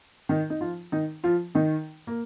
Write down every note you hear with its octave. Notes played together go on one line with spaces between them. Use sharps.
D#3 D#4
D#4
F3 F4
D#3 D#4
F3 F4
D#3 D#4
A#3